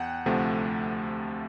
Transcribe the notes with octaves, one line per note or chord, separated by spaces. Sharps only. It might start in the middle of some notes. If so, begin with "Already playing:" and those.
Already playing: E2 F#5 G5
D2 C3 F3 A3